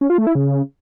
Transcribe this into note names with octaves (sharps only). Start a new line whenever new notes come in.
C#4
F4
A3
E4
C#3